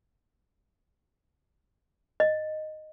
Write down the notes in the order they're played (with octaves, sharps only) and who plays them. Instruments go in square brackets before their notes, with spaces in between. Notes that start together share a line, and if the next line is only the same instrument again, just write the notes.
[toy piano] D#5